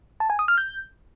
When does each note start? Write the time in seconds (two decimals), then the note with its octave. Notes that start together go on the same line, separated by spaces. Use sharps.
0.20 A5
0.30 G#5
0.39 D#6
0.48 F6
0.58 G6